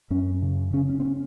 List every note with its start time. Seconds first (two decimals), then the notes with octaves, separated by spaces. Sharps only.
0.10 F#2 C#4
0.42 C#3
0.73 C#3 C#4
0.90 C#4
1.00 C4
1.05 C#4